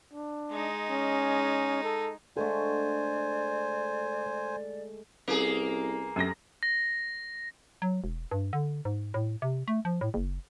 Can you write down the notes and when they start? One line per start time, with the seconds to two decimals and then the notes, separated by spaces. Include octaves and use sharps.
0.13 D4
0.51 G#3 D#4
0.90 C#4
1.83 A4
2.36 D3 G#3 A3 A4 C5 D5 G#5
5.28 C2 A#3 C#4 G#4 A4 B4
6.16 F#2 D4 G4 A4 A#6
6.63 A#6
7.82 F#3
8.04 E1
8.31 G2
8.53 D3
8.85 G#2
9.14 A2
9.42 C3
9.68 A3
9.85 F3
10.01 A2
10.14 F#1